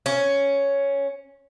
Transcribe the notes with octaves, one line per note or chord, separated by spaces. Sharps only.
C#4